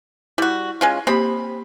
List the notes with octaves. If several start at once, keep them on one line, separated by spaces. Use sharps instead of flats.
G3 E4 F#4
G#3 C#4 F4
A#3 C4 G4 B5